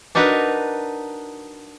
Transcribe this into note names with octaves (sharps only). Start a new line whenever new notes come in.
D4 D#4 F#4 A#4 B4